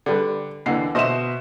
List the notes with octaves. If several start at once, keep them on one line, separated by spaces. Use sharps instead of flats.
D3 G3 B4
D#2 D3 E3 C7
B2 C5 D#5 E5 E7